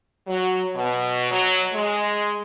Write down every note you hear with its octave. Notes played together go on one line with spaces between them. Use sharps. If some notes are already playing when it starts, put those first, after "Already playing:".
F#3
B2
F#3
G#3